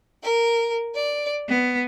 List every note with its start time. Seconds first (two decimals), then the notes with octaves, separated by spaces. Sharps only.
0.23 A#4
0.94 D5
1.46 B3